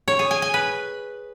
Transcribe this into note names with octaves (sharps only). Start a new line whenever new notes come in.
C#5
G#4
G#5
G#5
B4